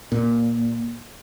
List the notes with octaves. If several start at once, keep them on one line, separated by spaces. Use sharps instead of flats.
A#2